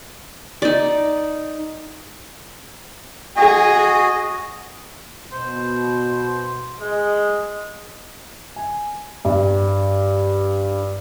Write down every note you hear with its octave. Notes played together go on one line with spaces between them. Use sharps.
D#4 D5
F#4 G#4 D#5
B2 C5
G#3 G#4 D#5
G#5
G2